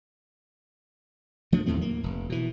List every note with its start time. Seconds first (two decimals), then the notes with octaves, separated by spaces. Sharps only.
1.52 F3 A3 D4
1.66 D#2 A2 A3 C4
1.81 A#3
2.04 F1
2.29 B2 E3